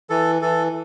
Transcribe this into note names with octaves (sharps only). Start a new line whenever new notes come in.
E3 A4
E3 A4